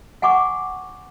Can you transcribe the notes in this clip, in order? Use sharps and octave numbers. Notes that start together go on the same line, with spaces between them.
F#5 G#5 B5 C#6 D6